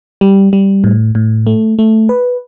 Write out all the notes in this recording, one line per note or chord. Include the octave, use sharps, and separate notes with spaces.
G3
G3
A2
A2
A3
A3
B4